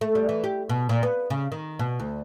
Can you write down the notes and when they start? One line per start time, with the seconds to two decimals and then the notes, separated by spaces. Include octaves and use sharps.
0.01 A3
0.15 G3
0.29 E3
0.44 G4
0.69 B2
0.89 A#2
1.03 B3
1.30 C#3
1.52 D#3
1.79 B2
2.00 D2